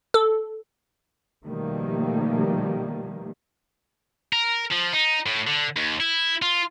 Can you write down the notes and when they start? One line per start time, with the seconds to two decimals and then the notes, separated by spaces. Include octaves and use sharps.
0.14 A4
1.45 B2 D#3 F3 G3 A3 A#3
4.33 A#4
4.72 F3
4.93 D#4
5.26 A2
5.47 D3
5.77 D#2
6.00 E4
6.42 F4